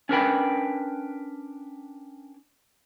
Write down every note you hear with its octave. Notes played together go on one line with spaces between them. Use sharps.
C#4 D4 A#4 B4 G5 B5